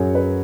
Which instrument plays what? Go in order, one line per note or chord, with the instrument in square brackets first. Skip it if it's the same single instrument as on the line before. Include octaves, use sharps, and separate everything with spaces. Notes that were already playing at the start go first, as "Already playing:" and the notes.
Already playing: [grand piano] F#2 F#3 G#4 C#5
B4